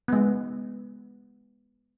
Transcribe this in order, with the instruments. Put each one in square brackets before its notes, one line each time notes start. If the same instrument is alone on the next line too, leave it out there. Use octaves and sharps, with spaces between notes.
[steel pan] G#3 B3